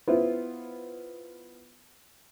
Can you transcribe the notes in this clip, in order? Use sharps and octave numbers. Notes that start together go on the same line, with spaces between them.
B3 E4 F4 C5